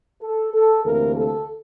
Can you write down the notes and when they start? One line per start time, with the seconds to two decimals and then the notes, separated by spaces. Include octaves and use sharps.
0.22 A4
0.54 A4
0.85 D2 C3 E3 A#3 A#4
1.16 A4